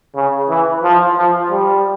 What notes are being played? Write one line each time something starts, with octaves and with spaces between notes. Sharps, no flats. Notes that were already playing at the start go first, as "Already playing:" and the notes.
C#3
E3
F3
F3
G3